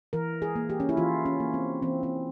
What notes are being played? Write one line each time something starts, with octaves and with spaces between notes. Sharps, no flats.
E3 A#4
G#4
A#3
G4
C#4
E4
E3 F4
C#4
A#3
C4
E3 C4
C4